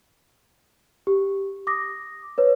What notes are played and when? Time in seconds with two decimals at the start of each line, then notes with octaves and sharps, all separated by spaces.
1.07 G4
1.67 D6 D#6 A#6
2.38 B4 C#5